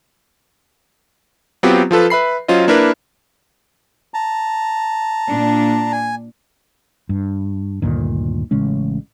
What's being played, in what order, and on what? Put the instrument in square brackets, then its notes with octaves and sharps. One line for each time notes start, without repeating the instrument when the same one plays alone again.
[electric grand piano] F#3 B3 C4 F4 G4
F3 F4 A4 B4
B4 E5 B5 C7
F#3 C#4 F4 C5 D#5
A#3 D4 E4 A#4 B4
[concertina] A5 A#5
[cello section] A#2 D4
[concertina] G#5
[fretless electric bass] G2
D2 G2 A#2 D#3
A1 C#3 G#3 C#4